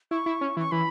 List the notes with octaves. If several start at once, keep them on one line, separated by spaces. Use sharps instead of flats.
E4 C#6
E4
C#4
E3
C#6
E3 B5